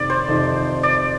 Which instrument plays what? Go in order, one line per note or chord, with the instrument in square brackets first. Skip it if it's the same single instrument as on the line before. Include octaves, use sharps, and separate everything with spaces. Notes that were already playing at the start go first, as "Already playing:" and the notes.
Already playing: [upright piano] F2 C3 D#3 [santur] D5
[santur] C5
[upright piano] F2 C3 D#3
[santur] D5